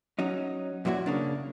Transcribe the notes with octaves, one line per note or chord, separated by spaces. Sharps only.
F#3 C#4 D#4
F#2 A#2 F#3 E4 F#4
C#3 A#3 D4